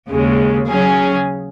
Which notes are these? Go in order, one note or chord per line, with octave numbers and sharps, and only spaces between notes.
D#2 C#3 G#3
C#3 F#3 C#4 G#4